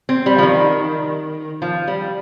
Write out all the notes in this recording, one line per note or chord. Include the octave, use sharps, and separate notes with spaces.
C4
G3
F3
D#3
F3
G3